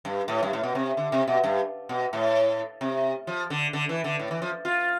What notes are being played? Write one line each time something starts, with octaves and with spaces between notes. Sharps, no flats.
G2
A2
G2
A2
B2
C3
D3
C3
B2
G2
B2
A2
C3
F3
D3
D3
E3
D3
A2
E3
F3
F4